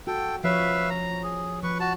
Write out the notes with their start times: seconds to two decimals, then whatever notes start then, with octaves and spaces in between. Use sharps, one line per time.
0.07 F#4 A4 G5
0.44 F3 B4 C#5 E5 F5
0.90 A#5
1.23 G#4
1.63 F3 B4 C#6
1.80 F#4 A5